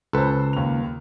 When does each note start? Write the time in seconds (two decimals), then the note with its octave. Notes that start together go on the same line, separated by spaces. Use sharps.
0.13 C#2 A4 B4 C5
0.53 D#2 F7